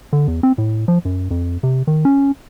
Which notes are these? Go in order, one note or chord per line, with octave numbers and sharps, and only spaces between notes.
D3
E2
C4
A2
F3
F#2
F2
C3
D#3
C#4